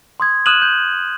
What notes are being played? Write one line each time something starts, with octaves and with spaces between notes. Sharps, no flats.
C6 D#6 G#6
D#6 F6 F#6 D#7 E7 F#7
G6